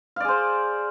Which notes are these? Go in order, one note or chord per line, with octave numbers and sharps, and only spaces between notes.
G#4 C5 D5 F5